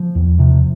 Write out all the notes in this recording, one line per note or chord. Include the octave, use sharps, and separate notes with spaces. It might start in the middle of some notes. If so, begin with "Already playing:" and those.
Already playing: F3
E2
C3